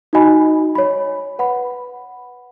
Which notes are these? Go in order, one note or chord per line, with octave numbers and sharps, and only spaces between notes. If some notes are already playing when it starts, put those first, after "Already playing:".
D#4 F#4 D#5 G#5 B5
C#5 B5
B4 F#5 B5